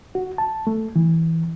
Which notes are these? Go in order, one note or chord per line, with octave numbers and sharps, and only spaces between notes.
F#4
A5
A3
E3